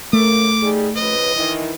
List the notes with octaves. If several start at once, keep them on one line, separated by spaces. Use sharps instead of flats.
C#3 A3 A#3 A#4 D6
G3 D#4 G#4
C#3 F3 B4 D#5
D#3 E3